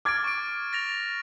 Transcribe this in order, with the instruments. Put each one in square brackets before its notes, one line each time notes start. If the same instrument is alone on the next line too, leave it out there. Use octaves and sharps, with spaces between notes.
[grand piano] D6 G#6 [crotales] F6 A6 D7
[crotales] C#6 D7
A6 A#6 F7